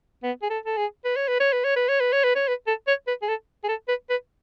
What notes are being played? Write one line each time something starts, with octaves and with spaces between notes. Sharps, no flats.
B3
G#4
A4
A4
G#4
B4
C#5
B4
C#5
B4
C#5
B4
C#5
B4
C#5
B4
C#5
B4
A4
C#5
B4
G#4
A4
G#4
A4
B4
B4